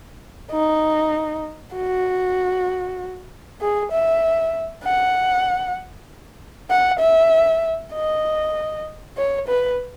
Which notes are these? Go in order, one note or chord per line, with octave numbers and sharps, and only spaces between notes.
D#4
F#4
G#4
E5
F#5
F#5
E5
D#5
C#5
B4